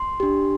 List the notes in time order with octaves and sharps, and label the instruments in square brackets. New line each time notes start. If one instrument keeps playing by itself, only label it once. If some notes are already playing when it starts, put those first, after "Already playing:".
Already playing: [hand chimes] C6
D4 G4